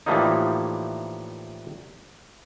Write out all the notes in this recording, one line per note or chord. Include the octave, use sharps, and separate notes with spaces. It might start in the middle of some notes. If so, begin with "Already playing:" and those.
A2 E3 F3 G3 A#3 D#4